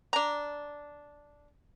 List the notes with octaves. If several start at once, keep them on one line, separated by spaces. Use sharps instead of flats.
D4 A#5